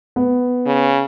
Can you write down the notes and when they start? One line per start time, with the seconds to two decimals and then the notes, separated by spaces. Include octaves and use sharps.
0.16 B3
0.66 C#3